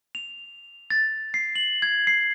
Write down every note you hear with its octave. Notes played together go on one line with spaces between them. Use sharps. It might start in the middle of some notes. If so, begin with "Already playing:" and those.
F7
A6
C7
F#7
G#6
C7